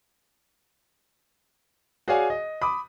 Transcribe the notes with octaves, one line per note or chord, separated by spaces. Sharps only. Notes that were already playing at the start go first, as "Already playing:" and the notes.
F#4 G#4 C#5 D5 F5 G#5
D#5
B5 D6 D#6